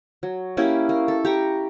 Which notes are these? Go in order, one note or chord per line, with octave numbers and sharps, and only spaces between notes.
F#3
A#3 C#4 E4 G4
A#3
A4
G4 A#5 C#6